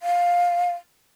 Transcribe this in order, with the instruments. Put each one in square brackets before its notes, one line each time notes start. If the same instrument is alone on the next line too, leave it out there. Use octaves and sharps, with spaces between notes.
[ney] F5